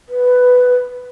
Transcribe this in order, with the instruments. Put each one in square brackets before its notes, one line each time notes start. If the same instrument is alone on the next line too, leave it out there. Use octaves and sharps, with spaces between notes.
[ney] B4